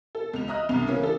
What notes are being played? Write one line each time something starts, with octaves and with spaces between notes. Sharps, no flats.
A4
C#2 F7
D#5 E5 A#5 D#6 F6 F#6
C2 G2 F7
C#3 E3 A#3 C#4
D4 A4